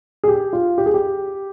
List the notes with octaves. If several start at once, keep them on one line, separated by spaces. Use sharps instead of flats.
G#4
G4
F4
G4
G#4
G4